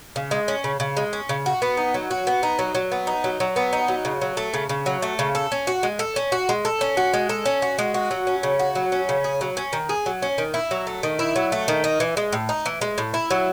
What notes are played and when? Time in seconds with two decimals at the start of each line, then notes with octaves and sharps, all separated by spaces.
0.16 C#3
0.31 G#3
0.48 C#4
0.64 C#3
0.80 C#3
0.97 G#3
1.13 C#4
1.29 C#3
1.46 F#4
1.62 B3
1.77 D#4
1.94 F#3
2.11 F#4
2.27 B3
2.43 D#4
2.59 F#3
2.75 F#3
2.92 B3
3.07 D#4
3.24 F#3
3.40 F#3
3.56 B3
3.73 D#4
3.88 F#3
4.05 C#3
4.21 F#3
4.37 A3
4.54 C#3
4.69 C#3
4.86 F#3
5.02 A3
5.19 C#3
5.35 A4
5.52 C#4
5.67 F#4
5.83 G#3
5.99 A4
6.16 C#4
6.32 F#4
6.49 G#3
6.65 A4
6.81 C#4
6.97 F#4
7.14 G#3
7.29 A4
7.46 C#4
7.62 F#4
7.79 G#3
7.94 F#4
8.11 F#3
8.27 C#4
8.43 C#3
8.59 F#4
8.75 F#3
8.92 C#4
9.09 C#3
9.24 G#4
9.41 F#3
9.57 C#4
9.73 D#3
9.89 G#4
10.06 F#3
10.22 C#4
10.38 D#3
10.54 E4
10.71 F#3
10.87 A3
11.03 D#3
11.19 E4
11.36 F#3
11.52 A3
11.68 D#3
11.84 D#4
12.00 E3
12.17 G#3
12.33 A2
12.49 D#4
12.66 E3
12.81 G#3
12.98 A2
13.14 E4
13.30 F#3